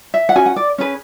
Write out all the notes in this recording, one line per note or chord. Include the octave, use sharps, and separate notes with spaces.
E5
F#5
C#4 F#4 B4 G#5
F#5
D5
C#4 G#4 B4